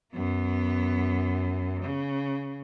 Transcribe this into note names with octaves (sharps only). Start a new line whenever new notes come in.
F#2 B3
C#3